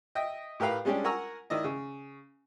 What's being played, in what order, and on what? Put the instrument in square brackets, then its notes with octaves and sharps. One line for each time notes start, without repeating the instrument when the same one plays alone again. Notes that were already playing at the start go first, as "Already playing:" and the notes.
[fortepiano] D#5 E5 G5
A2 G4 A#4 B4 F5
G3 G#3 C#4 D4 G4
A#4 F#5 G#5 A#5 C#6 E6
D#3 E4 D5 D#5
C#3